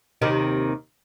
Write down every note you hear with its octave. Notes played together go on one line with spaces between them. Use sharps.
D#2 C3 D#3